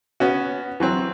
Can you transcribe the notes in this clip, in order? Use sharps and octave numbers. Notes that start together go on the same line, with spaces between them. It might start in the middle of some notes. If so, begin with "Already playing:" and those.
B3 C#4 F#4
E3 F#3 C4